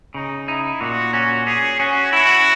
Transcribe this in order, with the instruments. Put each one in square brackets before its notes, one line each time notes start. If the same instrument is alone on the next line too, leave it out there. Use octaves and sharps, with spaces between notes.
[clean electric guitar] C#3 [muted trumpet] D#4
[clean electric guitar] D#4 [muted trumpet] E4
[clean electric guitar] A#2 [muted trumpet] F#4
[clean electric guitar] C#4 [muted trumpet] F#4
[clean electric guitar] C#4 [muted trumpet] G#4
[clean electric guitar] C#4 [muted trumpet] F#4
[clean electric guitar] E4 [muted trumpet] F#4